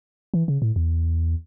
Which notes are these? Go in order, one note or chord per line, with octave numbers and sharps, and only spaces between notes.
E3
C#3
A2
E2